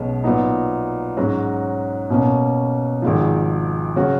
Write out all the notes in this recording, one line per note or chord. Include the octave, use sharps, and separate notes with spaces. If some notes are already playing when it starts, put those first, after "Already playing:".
Already playing: B1 B2 G#3 C#4
A#2 F#3 B3 D#4
G#2 F#3 C#4 F#4
B2 A#3 C#4
G#1 G#2 F3
C#3 F#3 C#4 F#4